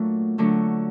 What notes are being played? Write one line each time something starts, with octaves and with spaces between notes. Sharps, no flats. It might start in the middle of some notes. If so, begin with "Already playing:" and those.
Already playing: A#2 F#3 A3 D4
D3 F#3 A3 D4